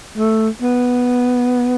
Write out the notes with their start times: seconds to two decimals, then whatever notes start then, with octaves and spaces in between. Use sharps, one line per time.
0.18 A3
0.62 B3